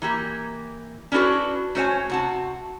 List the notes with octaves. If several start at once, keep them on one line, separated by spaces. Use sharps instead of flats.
E3 A#3 G4
C#4 D4 E4 F#4 A4 B4
A3 C#4 F#4 C5 C#5 G#5
C3 F#4 A5